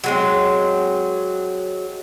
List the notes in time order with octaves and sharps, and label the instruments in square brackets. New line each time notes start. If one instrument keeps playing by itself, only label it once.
[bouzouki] F#3 G#3 C4